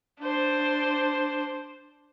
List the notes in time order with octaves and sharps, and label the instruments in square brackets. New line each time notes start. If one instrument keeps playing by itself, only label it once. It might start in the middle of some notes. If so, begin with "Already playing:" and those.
[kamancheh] D4 C5